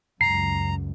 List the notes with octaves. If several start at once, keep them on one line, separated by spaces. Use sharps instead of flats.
C#2 F#2 A#5 C7